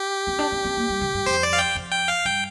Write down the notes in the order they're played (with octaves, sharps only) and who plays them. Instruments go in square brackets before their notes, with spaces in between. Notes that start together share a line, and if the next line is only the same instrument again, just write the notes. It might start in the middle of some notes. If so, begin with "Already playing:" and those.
Already playing: [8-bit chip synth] G4
[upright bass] C4
D4
C4
C4
A#3
G3
D3
G2
[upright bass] F2 [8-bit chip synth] C5
[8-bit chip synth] D5
F5
G5
[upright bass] F2
[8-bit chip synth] G5
F5
[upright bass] G2 [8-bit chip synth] G5